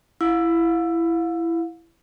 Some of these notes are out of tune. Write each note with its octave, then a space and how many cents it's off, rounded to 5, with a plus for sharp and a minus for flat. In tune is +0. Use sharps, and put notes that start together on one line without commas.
E4 +15 F5 +35